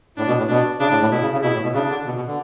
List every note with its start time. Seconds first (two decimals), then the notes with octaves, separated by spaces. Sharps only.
0.17 A2 D4
0.28 B2
0.38 A2
0.48 B2 D4
0.80 C#3 D4
0.91 A2
1.01 A2
1.11 B2 E4
1.22 C#3
1.33 C#3
1.43 B2 E4
1.53 A2
1.63 B2
1.74 C#3 D4
1.90 D3
2.06 B2
2.16 B2
2.27 D3